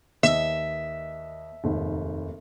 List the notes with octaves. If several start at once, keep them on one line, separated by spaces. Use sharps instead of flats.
D#2 D#5 E5
F1 D#2 G#2